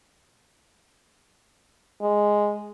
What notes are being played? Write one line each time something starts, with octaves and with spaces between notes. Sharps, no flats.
G#3